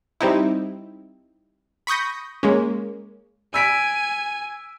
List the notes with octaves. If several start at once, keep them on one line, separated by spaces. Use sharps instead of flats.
G3 C4 D#4 E4
B5 C#6 D#6 G6 A#6
G#3 A#3 C#4
G#5 E6 B6 D7